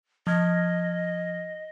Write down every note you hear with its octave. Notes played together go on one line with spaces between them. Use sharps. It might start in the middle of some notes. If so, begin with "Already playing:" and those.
F3 D#5 F6 G#6